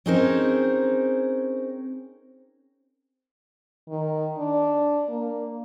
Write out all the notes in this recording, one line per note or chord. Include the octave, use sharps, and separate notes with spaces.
C4 C#4 D#4 G#4 A#4 C5
D#3
D4
A#3